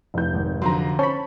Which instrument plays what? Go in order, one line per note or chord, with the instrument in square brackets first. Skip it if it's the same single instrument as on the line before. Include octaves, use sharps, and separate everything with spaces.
[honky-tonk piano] F1 G6
[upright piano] G#1
[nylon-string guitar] D3 F3 F#3 [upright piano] A#5 C6
[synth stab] C#4 B5 [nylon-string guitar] C5 [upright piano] A5 C#6